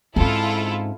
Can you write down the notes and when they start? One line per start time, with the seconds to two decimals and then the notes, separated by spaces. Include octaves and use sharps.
0.16 G#2 C4 C#4 E4 F4 A4